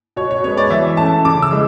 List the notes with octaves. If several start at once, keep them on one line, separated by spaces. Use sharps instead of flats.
B2 C#5
C#5
G#3 B3 C#5
D5
E3 E5
A3 C#4 A5
C#3 D6
E6
E3 G#3